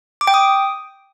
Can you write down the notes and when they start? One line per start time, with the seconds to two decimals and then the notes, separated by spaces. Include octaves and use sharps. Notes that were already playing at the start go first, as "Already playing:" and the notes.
0.21 D6
0.27 G5
0.34 D#6